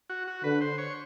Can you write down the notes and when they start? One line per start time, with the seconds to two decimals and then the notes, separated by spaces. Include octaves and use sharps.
0.09 F#4
0.28 F#4
0.44 D3 B4
0.61 C5
0.78 C#5